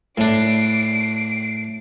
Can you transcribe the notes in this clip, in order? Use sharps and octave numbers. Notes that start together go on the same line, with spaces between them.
A2 D4 C7 D7